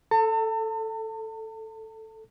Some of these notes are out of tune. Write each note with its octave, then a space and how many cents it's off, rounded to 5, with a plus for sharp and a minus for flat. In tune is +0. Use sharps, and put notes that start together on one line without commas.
A4 +0 A5 +40